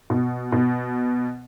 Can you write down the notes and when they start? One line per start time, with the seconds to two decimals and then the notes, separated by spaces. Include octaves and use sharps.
0.10 B2
0.52 B2